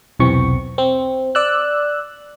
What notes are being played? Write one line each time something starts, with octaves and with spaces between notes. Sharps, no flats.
B1 E2 C3 E3 C4 C#6
C4
D5 E6 F#6